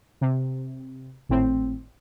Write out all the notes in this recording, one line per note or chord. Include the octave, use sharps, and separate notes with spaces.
C3
G#1 A2 C4